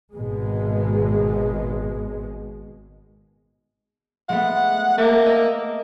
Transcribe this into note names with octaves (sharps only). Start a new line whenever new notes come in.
G#1 B2 G#3
G#3 A3 B3 F#5
A#3 E5 A5 D6
D#5 E6 D#7